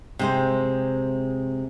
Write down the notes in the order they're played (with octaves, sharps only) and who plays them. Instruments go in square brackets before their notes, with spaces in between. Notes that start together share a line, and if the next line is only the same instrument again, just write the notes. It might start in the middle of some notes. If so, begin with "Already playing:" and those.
[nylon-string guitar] C3 G#3 C5